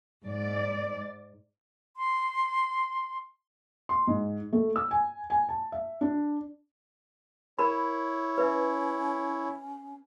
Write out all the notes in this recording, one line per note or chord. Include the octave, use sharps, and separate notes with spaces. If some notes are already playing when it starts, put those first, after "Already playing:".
G#2 D5
C6
C6
G#2
A3
E6
G#5
G#5
A5
E5
D4
E4 A#4 C#5 B5
C#4 B4 E5